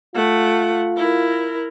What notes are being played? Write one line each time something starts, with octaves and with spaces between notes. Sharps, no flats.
A3 F4 F#5
E4 A#4